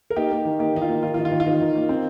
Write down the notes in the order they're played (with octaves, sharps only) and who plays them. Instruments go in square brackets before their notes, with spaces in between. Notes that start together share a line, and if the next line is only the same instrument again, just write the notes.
[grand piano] A#4
A#3 D#4 G4
A#3
D#3
A#3 D#4 G4
D#3 D#4
F4
A#3
D#3 F4
F4
D#3 D#4
F4
D#3
F4
D#3 D#4
D#3
A#3
C4